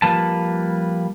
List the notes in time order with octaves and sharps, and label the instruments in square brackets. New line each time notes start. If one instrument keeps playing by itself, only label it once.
[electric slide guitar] F3 G3 A#3 B4 A5